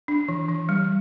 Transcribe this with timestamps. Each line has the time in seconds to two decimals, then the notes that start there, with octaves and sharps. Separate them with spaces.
0.08 D4
0.28 E3
0.49 E3
0.69 G3